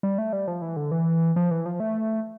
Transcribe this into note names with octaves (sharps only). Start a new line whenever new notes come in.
G3
A3
G3
F3
E3
D3
E3
F3
E3
F3
A3